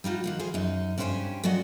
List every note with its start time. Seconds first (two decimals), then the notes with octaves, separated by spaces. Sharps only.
0.04 G3 D#4 F4 F#4
0.24 D#3 F4 F#5
0.39 G#4 C5 F5
0.54 F#2 D#4
0.98 G2 C#4 G4 C5 G5 G#5
1.44 F#3 F4 F#4 D5 D#5 F#5